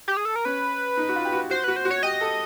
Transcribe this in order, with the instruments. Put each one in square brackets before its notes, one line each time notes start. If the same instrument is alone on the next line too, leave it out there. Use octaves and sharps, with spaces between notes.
[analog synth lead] G4
G#4
A4
A#4
[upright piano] C#4 [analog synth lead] B4
[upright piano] D#4
F#4
F4
G4
F#4
[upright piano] F#4 [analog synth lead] C5
[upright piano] F#4 [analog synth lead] B4
[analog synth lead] C5
[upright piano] F#4
[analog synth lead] C#5
[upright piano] G4 [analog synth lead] D#5
[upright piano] A4